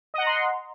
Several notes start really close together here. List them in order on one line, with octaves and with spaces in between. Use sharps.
D#5 F#5 A#5 C6